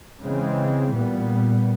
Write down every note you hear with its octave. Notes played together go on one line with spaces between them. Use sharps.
C#3 E3 G#3 C4
A#2 G3 B3